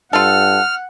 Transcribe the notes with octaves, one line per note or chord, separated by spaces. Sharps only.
G2 F4 A4 F#5 F6